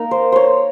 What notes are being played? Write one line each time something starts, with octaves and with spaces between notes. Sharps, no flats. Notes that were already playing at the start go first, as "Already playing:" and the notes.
Already playing: A#3 D#4 A#4
C5
C5 C#5